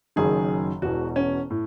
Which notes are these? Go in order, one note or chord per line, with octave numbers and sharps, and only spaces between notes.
F#1 F#2 D#3 G#4
E1 E2 B2 F#4
C#4
A2